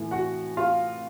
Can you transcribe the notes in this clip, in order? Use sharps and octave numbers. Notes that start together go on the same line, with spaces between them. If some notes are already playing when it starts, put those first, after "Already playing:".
Already playing: A2 E3 A3 G#5
F#4 F#5
F4 F5